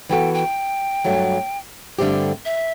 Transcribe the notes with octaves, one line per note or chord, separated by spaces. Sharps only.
E3 B3 F#4 A4 G5
G5
G2 F#3 A3
G2 D3 A3 C4 G4
E5